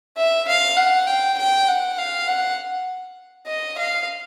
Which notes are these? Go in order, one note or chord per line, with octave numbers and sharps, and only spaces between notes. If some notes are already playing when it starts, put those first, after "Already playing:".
E5
F5
F#5
G5
G5
F#5
F5
F#5
D#5
F5